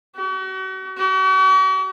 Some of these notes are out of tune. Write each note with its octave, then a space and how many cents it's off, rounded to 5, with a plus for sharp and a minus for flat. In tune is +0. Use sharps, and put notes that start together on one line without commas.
F#4 +40
F#4 +45